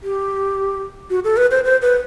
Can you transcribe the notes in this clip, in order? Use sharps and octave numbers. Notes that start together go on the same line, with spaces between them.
G4
F#4
A4
B4
C5
C5
B4